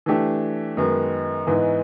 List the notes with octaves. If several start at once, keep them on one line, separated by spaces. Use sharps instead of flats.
E3 A3 D4 G4
F#2 D#3 G#3 B3
G#2 E3 G#3 B3 D#4